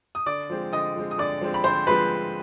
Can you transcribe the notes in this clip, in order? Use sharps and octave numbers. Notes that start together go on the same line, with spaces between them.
D#6
D3 D5 D6
F3 G#3 C4
D3 D#5 D#6
F3 G#3 C4
D#6
D3 D5 D6
F3 G#3 C4
B5
D3 C5 C6
F3 G#3 C4 B4 B5